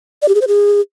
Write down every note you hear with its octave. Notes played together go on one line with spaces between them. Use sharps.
D5
G4
G#4
C5
G#4